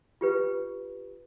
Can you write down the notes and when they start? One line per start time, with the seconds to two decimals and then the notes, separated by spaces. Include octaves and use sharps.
0.21 F4 G4 B4